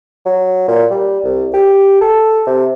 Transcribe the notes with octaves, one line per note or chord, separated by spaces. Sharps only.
F#3
A#2
G3
C2
G4
A4
C3